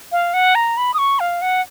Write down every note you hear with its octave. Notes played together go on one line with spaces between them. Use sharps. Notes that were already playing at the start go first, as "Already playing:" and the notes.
F5
F#5
A#5
B5
D#6
C#6
F5
F#5